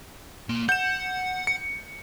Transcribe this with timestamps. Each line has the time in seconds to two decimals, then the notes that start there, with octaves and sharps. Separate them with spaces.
0.49 A#3 D5
0.69 F#5 G6 E7
1.47 C#7